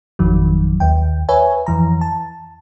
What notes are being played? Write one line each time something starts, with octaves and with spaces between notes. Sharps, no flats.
G#1 F2 D#3 F#3
D#2 G5
B4 C#5 E5 G#5
F2 E3 A#5
A5